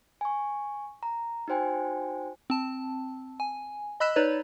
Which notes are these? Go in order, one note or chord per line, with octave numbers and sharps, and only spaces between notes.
G#5 C#6
A#5
D#4 F#4 C5 G5 G#5
C4 A5
G#5
D#5 B5 E6 F#6 B6 E7
D#4 B4 C#5 D5